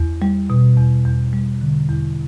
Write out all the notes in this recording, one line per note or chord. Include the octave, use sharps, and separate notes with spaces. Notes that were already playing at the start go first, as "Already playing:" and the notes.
Already playing: E2
G3
B2
E2
E2
G3
D3
E2